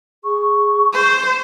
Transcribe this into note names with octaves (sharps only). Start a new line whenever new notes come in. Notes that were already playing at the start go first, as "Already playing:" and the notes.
G#4 C#6
C5